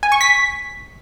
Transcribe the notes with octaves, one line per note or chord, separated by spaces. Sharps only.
G#5
C#6
B6